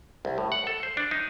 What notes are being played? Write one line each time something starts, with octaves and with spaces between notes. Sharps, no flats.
C2
A2
F#5
A4
C5
D4
D#4